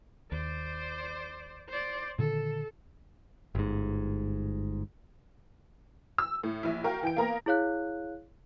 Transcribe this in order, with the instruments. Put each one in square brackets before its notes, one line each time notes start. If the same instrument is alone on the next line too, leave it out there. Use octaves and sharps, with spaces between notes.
[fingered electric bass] D#2 [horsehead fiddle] C5 D5
[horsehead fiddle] C5 D5
[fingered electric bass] A#2 D3 D#3 [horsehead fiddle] A4
[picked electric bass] G1 G#2
[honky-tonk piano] E6
A2
A#1 E4
F#4 A#4 F5 G5
E3 G5 D7
A#3 B3 A#4 A#5
[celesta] E4 G#4 C#5 F5 F#6